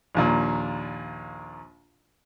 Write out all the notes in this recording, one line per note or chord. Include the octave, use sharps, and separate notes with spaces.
A#1 D#2 A#2